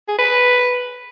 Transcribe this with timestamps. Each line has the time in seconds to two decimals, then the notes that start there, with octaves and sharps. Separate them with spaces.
0.09 G#4
0.19 B4